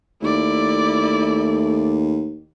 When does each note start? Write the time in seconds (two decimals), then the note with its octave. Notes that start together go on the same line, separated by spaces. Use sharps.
0.22 D#2 A3 E4 D5